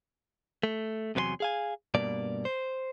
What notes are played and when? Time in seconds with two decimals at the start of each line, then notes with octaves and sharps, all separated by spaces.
0.63 A3
1.15 E2 C3 F#3 B4 G#5 C6
1.40 G#4 F5 G#5
1.94 G2 B2 A#3 D5
2.45 C5